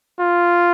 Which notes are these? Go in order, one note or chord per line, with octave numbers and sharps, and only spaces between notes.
F4